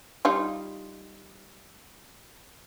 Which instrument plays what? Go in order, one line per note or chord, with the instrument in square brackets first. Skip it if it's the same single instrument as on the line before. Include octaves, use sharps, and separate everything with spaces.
[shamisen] G3 D#4 F4